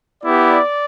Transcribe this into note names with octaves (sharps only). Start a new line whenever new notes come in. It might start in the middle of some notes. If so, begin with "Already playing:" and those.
B3 E4 G4 D5